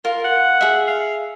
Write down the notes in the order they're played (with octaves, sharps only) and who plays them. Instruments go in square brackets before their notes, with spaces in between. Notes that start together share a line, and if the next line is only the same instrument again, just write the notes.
[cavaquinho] F4 [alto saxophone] A#4
[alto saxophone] F#5
[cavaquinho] G#4 E5
[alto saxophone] F5